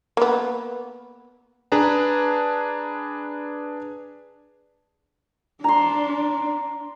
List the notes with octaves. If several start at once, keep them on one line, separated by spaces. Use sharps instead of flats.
A#3 B3
D4 G#4 B4 A5 A#5
D4 A#5 C6